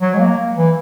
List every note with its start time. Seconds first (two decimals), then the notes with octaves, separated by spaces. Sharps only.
0.01 F#3
0.14 G#3
0.20 A#3
0.57 E3